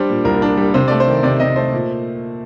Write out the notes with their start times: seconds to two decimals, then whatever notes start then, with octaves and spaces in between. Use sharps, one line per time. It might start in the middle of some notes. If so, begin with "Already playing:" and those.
Already playing: G3 D4 C5
0.09 A#2
0.25 C2 A#4
0.42 D4
0.57 G3
0.74 C3 C5
0.88 A3 D5
1.00 C5
1.07 D#3
1.23 C3 D5
1.40 C3 D#5
1.56 A3 C5
1.72 A#2